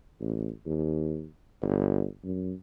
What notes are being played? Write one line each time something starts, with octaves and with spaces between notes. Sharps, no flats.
A1
D#2
G1
F#2